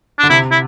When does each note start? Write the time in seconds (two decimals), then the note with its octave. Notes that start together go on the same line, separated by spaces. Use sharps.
0.19 D3 D4
0.30 C3 E4
0.51 E4